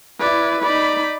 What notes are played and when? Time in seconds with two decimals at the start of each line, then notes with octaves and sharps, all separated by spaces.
0.20 E4 B4 D5
0.62 D#4 D5 B5